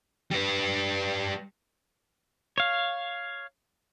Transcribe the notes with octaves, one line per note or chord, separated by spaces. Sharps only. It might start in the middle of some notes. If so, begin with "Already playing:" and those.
G3 B4
C#5 F5